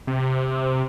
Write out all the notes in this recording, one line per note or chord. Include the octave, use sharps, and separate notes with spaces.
C3